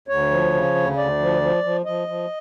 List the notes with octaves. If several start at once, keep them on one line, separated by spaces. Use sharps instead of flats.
D2 C#5
F3
C#3
D2
D2 D5
F3
F3
F3
F3 D#5
F3